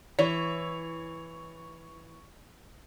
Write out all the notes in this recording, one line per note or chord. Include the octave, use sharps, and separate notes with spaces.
E3 C#5